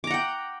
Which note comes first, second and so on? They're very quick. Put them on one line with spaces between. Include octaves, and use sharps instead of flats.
D6 A#5 F#5 G5